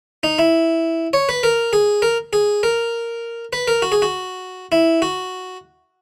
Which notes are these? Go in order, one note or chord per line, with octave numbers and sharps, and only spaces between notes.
D#4
E4
C#5
B4
A#4
G#4
A#4
G#4
A#4
B4
A#4
F#4
G#4
F#4
E4
F#4